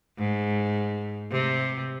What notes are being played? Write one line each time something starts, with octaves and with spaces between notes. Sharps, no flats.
G#2
C3